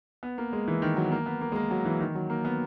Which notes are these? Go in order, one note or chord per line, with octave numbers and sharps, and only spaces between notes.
B3
A#3
G#3
E3
D#3
F#3
B3
A#3
B3
A#3
G#3
A#3
F#3
E3
D#3
F#3
A#3
B3